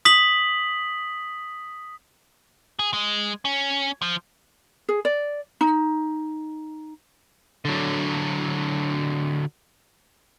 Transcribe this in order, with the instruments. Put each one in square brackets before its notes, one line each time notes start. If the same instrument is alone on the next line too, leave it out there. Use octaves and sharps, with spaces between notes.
[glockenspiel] D#6 B6 F#7
[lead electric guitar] G#4
G#3
C#4
F3
[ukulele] G#4
D5
D#4
[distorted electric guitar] D3 F#3